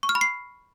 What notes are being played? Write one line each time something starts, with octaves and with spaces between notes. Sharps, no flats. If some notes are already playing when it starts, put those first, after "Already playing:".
C#6
F6
B5
C7